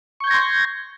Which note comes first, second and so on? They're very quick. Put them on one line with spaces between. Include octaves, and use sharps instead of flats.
C#6 G6 G#6 A#6 C6